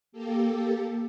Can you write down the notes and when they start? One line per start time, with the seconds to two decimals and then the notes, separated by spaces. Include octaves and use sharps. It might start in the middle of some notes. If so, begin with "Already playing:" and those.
0.12 A#3 G4 A4